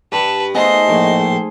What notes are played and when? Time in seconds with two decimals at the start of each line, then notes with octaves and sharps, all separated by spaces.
0.12 G2 B4 A5
0.55 A3 B3 D#4 G#4 C5 D#5 C6
0.88 A#1 A2